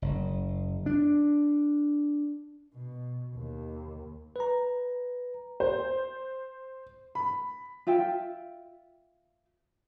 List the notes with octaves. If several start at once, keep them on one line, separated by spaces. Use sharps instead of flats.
F#1
D4
B2
D#2
B4 A#5
C5
B5
F4 E5 G5